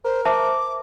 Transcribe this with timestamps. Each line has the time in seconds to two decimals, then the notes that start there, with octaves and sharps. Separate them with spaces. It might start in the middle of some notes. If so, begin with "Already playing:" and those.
0.05 A#4 C5
0.25 C5 E5 A5 D6